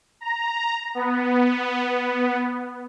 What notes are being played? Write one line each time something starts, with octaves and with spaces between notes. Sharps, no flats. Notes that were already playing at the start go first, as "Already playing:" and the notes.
A#5
B3